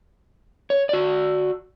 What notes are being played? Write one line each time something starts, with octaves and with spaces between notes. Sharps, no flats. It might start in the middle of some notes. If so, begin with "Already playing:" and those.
C#5
F#4 D5